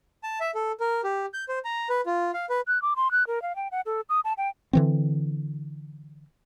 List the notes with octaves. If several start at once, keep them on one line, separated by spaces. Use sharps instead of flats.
A5
E5
A4
A#4
G4
G6
C5
A#5
B4
F4
F5
B4
F#6
D6
C6
F#6
A#4
F5
G5
F#5
A4
D#6
A5
G5
D3 E3 C4